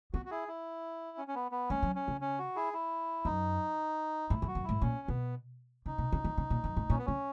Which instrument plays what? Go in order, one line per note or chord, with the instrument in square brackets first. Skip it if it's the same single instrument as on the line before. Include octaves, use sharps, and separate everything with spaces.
[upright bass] B3 [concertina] F#4
[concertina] F#4
E4 G#4
E4
C#4
C#4
B3
B3
[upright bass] G#3 [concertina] C#4
[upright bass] F#3
[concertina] C#4
[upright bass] C#3
[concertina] C#4
F#4
E4 G#4
E4
[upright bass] F#2 [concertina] D#4
[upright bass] G#2 [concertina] E4
[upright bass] F#2
[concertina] F#4
[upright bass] F#2
[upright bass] G#2 [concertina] E4
[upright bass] A#2 [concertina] C#4
[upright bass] B2 [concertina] B3
[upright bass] C#3 [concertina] D#4
[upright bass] B2
C#3
D#3
C#3
A#2
F#2
G#2
[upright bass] A#2 [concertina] C#4
[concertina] B3
[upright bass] C#3 [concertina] C#4